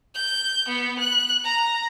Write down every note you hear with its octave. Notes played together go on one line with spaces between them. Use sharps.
G6
B3
F#6
A#5